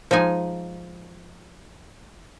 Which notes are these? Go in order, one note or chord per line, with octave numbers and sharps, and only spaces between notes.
F3 G#3 D#4 G#5